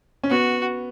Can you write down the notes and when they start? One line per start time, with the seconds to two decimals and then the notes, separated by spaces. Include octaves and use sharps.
0.23 C#4
0.30 B3 F#4